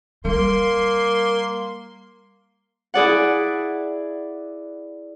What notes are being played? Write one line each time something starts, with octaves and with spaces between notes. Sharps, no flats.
G3 A#3 C6
E4 G#4 D5 F#5